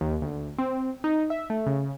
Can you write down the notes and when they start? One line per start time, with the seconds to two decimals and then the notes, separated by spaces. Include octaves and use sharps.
0.01 D#2
0.22 D2
0.58 C4
1.04 D#4
1.30 E5
1.50 A3
1.66 C#3